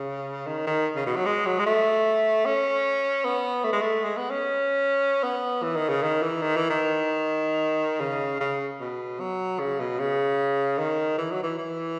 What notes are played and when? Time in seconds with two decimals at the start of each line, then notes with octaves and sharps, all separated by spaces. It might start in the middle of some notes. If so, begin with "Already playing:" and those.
Already playing: C#3
0.47 D#3
0.67 D#3
0.96 C#3
1.06 B2
1.16 F#3
1.26 G#3
1.46 F#3
1.59 G#3
1.66 A3
2.46 C#4
3.25 B3
3.64 A3
3.73 G#3
3.81 A3
4.04 G#3
4.17 B3
4.31 C#4
5.23 B3
5.63 E3
5.76 D#3
5.89 C#3
6.03 D#3
6.22 E3
6.42 D#3
6.56 E3
6.70 D#3
8.01 C#3
8.41 C#3
8.80 B2
9.20 F#3
9.60 C#3
9.80 B2
9.99 C#3
10.78 D#3
11.18 E3
11.31 F#3
11.43 E3
11.58 E3